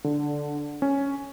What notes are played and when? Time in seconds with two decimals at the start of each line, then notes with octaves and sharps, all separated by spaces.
0.04 D3
0.82 C#4